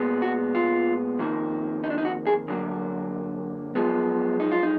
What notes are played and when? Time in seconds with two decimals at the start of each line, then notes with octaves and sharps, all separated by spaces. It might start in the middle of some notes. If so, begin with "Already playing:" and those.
Already playing: A#2 G#3 B3
0.22 F#4
0.55 F4
1.19 F2 D#3 A#3
1.84 D#4
1.90 D4
1.98 D#4
2.05 F#4
2.27 G#4
2.48 F#2 D3 F#3 A#3
3.75 F#2 F3 G#3 B3
4.40 D#4
4.52 F4
4.63 D#4